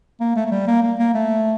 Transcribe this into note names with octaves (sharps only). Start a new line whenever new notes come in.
A#3
A3
A3
G3
A#3
A#3
A#3
A3